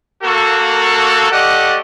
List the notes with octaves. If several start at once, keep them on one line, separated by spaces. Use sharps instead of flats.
A#3 F#4 A4
A3 G4 A4 D5 D#5 F#5